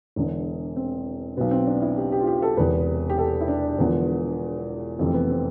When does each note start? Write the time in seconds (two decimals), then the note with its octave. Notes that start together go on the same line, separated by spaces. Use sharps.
0.16 E1 E2 D3
0.76 C4
1.37 B1 B2 B3
1.51 C4
1.67 D4
1.82 E4
1.97 G4
2.12 G4
2.20 F4
2.27 G4
2.42 A4
2.57 E1 E2 C3 B4
3.10 G4
3.18 A4
3.41 E4
3.48 D4
3.78 E1 E2 D3 F3 B3
4.99 F1 F2 E3 C4
5.14 B3
5.29 C4